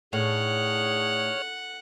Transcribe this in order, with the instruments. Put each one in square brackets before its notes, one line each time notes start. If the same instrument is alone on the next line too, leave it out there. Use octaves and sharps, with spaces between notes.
[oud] A2 [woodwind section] D4 D#4 G#4 [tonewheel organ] C#5 F6 [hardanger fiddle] F#5